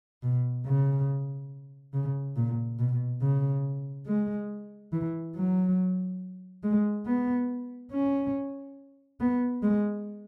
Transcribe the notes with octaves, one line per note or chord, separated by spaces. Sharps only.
B2
C#3
C#3
A#2
B2
C#3
G#3
E3
F#3
G#3
B3
C#4
B3
G#3